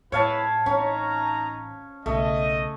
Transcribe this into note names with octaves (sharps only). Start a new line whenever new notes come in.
A2 E4 B4 C#5 F5 A5
A1 C#4 D#4 A#5
B1 C#3 A3 D#5